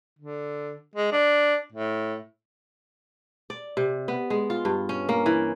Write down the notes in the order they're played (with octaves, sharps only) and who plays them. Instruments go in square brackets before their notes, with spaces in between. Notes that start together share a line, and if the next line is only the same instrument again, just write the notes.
[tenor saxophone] D3
G#3
D4
A2
[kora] D5
C3
B3
G#3
F4
G2
C#4
A#3
E3